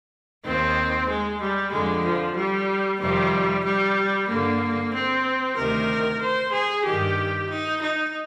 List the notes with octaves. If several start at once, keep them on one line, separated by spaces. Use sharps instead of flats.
D#2 D#3 C4
G#3
G3
F2 D3 G#3
F3
G3
F2 C3 D#3 G3
G3
G2 D3 A#3
C4
D2 C3 D#3 A#4
C5
G#4
G2 D#3 G4
D#4
D#4